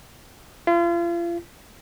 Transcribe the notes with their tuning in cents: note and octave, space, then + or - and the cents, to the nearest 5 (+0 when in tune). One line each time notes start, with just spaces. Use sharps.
F4 -35